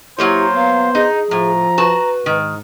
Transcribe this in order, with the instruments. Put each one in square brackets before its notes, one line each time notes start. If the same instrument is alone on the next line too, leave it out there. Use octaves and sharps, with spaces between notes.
[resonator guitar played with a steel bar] F#3 A#3 C#5 [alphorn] E4 [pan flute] G4 [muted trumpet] C5
[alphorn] B3 [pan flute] F5
[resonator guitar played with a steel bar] D#4 [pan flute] G#4
[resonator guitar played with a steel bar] A2 [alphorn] F3 [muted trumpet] A#5
[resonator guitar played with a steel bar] F#4 A5 [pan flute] B4
[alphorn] G#2 [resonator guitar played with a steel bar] D#3